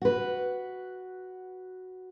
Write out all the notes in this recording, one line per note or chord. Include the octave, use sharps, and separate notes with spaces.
F#4 B4